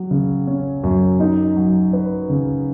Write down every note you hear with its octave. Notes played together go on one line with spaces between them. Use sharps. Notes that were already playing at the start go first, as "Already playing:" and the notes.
Already playing: F#3
C#3
C#4
F#2
D#4
F#3
B4
C#3